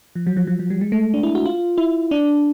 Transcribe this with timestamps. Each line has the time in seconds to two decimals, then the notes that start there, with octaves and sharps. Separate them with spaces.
0.15 F3
0.27 F#3
0.37 F3
0.47 F3
0.59 F#3
0.70 G3
0.81 G#3
0.92 A3
1.14 D4
1.23 E4
1.35 F#4
1.45 F4
1.78 E4
2.11 D4